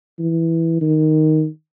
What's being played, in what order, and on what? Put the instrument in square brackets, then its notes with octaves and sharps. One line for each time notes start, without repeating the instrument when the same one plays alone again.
[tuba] E3
D#3